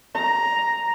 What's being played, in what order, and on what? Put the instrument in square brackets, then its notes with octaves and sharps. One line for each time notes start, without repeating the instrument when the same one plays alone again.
[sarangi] A#5